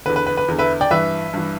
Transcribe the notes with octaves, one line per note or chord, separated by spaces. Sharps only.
E2 D3 B4
B4
B4
B4
E2 D3
B4 E5
D5 G5
G2 E3 B4 E5
G2 E3